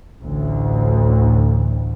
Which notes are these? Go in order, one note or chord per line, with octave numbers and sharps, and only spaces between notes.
A1 D2